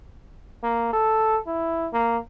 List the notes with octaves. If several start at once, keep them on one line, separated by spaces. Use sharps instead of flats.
A#3
A4
E4
A#3